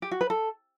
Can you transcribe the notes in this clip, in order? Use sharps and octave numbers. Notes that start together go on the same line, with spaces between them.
G4
F#4
B4
A4